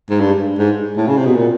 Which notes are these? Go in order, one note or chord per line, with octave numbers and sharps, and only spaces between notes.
G#2
G2
G#2
A2
C#3
C3
B2
A#2